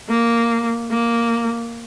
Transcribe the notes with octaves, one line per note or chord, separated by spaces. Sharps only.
A#3
A#3